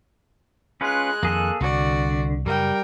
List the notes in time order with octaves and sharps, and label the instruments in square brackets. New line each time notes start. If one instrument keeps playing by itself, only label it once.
[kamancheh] G#3 F#6 [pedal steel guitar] C#4 F4 B4
[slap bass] F2 D#3 [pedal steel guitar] A#3 G#4 A4
[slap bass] C2 [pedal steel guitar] D3 [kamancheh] F#4 D5
[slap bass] F#2 C#3 [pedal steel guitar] G3 [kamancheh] A#4 G5